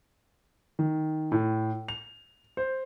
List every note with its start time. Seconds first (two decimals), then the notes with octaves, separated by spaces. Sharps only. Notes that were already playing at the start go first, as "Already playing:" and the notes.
0.79 D#3
1.32 A2
1.88 F7
2.57 C5